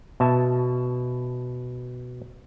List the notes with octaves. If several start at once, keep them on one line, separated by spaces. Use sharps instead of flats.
B2 E5 A5